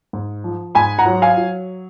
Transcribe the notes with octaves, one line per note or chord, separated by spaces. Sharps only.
G#2
F3
G#2 G#5 B5
F#5 A#5
F#3
F5 G#5
F#3